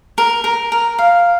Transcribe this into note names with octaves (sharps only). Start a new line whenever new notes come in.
A#4
A#4
A#4
F5